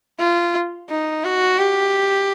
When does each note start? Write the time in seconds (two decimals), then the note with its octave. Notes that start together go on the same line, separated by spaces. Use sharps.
0.19 F4
0.89 D#4
1.24 F#4
1.59 G4